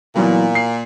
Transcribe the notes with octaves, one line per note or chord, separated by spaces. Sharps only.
A#2 E3 F#3 B3
C7